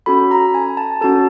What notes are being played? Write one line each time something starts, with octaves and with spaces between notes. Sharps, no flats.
C#4 F#4 A4 B5
A#5
G#5
A5
C#4 F#4 A4 A5